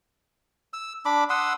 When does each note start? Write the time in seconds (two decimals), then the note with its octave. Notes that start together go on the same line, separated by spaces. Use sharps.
0.73 E6
1.05 D4 B5 D6
1.30 F#5 C6 D#6 E6